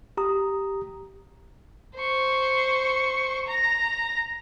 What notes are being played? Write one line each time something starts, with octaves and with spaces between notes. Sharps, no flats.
G4 A#5 D#6
C5 C#6
A#5 A#6